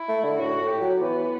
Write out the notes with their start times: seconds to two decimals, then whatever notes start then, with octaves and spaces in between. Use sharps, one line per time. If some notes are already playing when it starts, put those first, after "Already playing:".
Already playing: E4
0.09 A3
0.24 D3
0.40 A2 F#4
0.61 A2
0.71 G4
0.81 F#3
1.01 E3 B3